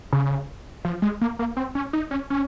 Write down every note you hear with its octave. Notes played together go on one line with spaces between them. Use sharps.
C#3
F3
G#3
A#3
A#3
C4
C#4
D#4
C#4
C#4